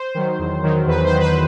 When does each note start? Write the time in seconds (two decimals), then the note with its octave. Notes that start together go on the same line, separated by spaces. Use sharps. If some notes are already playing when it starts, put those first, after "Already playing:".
Already playing: C5
0.15 D#3 F#3
0.39 E2
0.63 D#3 F#3
0.87 E2 B4
1.04 C5
1.12 D#3 F#3
1.20 B4